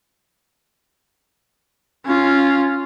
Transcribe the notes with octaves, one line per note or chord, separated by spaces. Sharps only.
C#4 F4